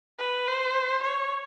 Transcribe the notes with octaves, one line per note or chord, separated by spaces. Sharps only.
B4
C5
C#5